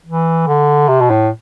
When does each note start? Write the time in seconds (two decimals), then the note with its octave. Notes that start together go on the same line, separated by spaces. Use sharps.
0.06 E3
0.47 D3
0.88 C3
1.00 B2
1.10 A2